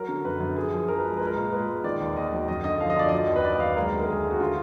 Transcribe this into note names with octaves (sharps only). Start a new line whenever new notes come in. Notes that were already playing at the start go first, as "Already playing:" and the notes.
Already playing: F#3 A#4
D3
F#2 B4
F#2
F3 G#4
F3
F3 A#4
B4
G#3 A#4
G#3 B4
A#4
A#2
G#3 B4
G#3
D#3 D5
D#2
D#2 D#5
F#3
F#2 D#5
D3 D#5
F3 F5
D#5
F#2 D5
F#3 D#5
D#2
B4
D#2 D5
D#5
D#2 F5
G#3 A#4
D2
A#4
G#3 G#4
D2
F#4
D3 F4